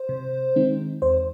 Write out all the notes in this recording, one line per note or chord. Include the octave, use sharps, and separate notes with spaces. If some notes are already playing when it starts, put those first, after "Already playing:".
Already playing: C5
C3
D#3 G#3 C4 D#4
E2 C5